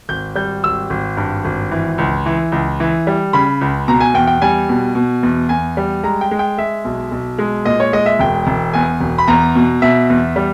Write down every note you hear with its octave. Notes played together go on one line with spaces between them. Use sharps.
G#1 G6
G3 G6
G#1 E6
G#1
G2
G#1
E3
C#2
E3
C#2
E3
G3
C#3 B5
C#2
B2 A#5
G#5
E2 G5
G5
G3 G#5
B2
B2
E2
E2 G#5
G3
G#3 A#5
G5
G#3
G5
G#3 E5
B1
B1
G#3
A#2 D#5
C#5
G#3 D#5
E5
E1 G5
E1
E2 G#5
E1
B5
E2 A#5
B2
B2 E5
E2
G3